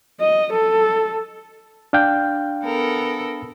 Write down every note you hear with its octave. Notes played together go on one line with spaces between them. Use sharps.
D#5
A4
D4 F5 G5
B3 A4 A#4